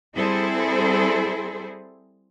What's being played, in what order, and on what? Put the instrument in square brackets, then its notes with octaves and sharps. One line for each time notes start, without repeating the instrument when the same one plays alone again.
[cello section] G3 C4 E4 G#4 A4 C5